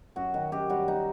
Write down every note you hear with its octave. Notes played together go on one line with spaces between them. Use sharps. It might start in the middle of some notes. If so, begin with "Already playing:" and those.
F#2 F#4
D#3
F#2 G4
G3 F#4
D#4